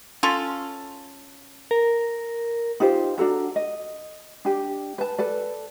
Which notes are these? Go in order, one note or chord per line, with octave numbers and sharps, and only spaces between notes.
C#4 F4 A4
A#4
D#4 F4 G4 C5
D4 F#4 A4 A#5
D#5
D4 G4
B4 A5
A4 B4 D5